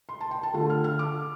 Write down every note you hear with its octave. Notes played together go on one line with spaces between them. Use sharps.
C6
A5
G5
A5
D3 A3 F4 A5
F6
F6
D6